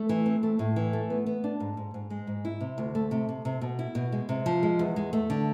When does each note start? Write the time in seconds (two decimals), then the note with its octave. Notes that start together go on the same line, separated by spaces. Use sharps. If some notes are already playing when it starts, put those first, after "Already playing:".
Already playing: A3
0.09 E3
0.26 C4
0.43 A3
0.59 A2
0.76 E3
0.93 A3
1.10 B3
1.26 B3
1.44 D4
1.60 G#2
1.77 G#2
1.94 G#2
2.10 G#3
2.27 G#2
2.45 E4
2.61 C3
2.78 D2
2.95 A3
3.11 C3
3.29 C3
3.45 C3
3.61 B2
3.79 E4
3.95 B2
4.12 G#3
4.29 C3
4.46 F3
4.63 G#3
4.79 E2
4.96 G#3
5.13 A3
5.30 D3